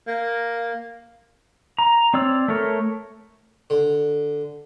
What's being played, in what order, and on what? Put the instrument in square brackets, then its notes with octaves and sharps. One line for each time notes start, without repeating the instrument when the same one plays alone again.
[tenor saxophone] A#3
[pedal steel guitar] A#5
C4 C#5 D5 E6
A3 A4 A#4 C#5
[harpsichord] D3